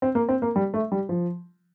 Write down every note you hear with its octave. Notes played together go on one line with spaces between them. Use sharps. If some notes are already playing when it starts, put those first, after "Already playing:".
C4
A#3
C4
A#3
G3
A3
G3
F3